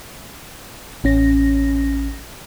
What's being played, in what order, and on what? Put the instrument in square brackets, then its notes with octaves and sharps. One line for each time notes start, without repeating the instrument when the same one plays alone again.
[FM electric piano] A1 C#4 A#6